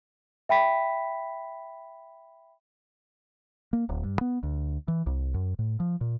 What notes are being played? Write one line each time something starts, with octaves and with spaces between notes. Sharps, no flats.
E5 G5 B5 B6
A#3
D1
G2
B3
D2
E3
C2
F#2
A2
F3
A#2